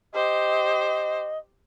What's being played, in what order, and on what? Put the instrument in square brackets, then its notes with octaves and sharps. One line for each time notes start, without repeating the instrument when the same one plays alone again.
[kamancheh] G4 C5 [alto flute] D#5